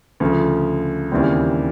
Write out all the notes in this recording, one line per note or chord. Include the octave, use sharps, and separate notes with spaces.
D2 C#3 F3
D#2 C#3 E3 G3 C4